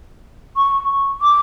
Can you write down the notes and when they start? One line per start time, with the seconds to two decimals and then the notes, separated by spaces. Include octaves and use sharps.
0.57 C#6
1.22 D6